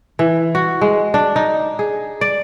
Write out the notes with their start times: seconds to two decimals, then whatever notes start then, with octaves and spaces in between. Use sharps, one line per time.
0.19 E3
0.55 F#4
0.82 G#3
1.14 D4
1.36 D#4
1.79 G#4
2.21 D5